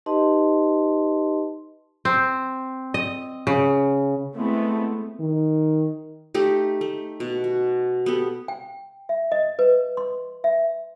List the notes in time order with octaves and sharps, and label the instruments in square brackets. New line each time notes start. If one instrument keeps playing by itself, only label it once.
[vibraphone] D#4 G4 B4 D#5 A5 C6
[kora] C4
D#5
C#3
[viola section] G#3 A3 B3 C4 E4
[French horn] D#3
[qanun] A3 D#4 G4
A3
B2
F#4
B3 G4 A4
[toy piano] G5
E5
D#5
B4
C6
E5